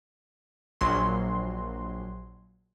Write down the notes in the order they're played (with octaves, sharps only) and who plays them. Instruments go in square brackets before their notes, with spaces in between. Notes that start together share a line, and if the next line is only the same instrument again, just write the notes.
[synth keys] A#1 F#3 C6